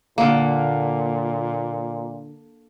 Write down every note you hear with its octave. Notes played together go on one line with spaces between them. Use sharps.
A#2 D3 A#3